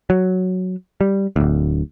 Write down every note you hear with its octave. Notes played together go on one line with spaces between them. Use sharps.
F#3
G3
D1 D2